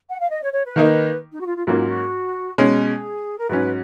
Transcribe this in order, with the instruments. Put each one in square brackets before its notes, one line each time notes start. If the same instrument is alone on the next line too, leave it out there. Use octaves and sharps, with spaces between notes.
[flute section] F#5
F5
D#5
C#5
C#5
B4
[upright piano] D#3 A#3 D#4
[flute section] D#4
F#4
F4
F4
[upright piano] G#2 F#3 A#3 C#4 [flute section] F4
[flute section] F#4
[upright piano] B2 G#3 C#4
[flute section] G#4
A#4
[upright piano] G#2 F#3 C#4 [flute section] B4